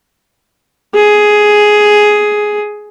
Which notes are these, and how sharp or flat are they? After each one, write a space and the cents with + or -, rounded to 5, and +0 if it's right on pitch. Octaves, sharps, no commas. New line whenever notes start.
G#4 +10